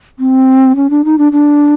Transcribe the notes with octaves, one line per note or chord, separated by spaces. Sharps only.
C4
C#4
D4
D#4
D4
D4